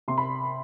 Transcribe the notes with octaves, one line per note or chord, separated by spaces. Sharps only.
C3 C6
B5